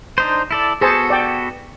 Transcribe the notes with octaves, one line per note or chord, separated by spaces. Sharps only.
D4 D#4 C5
E4 A4 D5
B3 F#4 G#4 A4 C5 A5
D5 G5